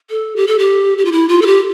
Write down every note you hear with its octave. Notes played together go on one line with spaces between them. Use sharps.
A4
G4
A4
G4
G4
F4
E4
F4
A4
G4